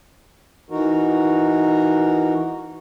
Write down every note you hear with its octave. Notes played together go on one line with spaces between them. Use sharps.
E3 D#4 F#4 A#4